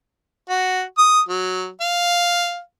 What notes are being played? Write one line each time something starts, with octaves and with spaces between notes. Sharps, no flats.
F#4
D#6
F#3
F5